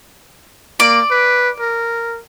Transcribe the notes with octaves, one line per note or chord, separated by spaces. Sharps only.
A#3 D5
B4
A#4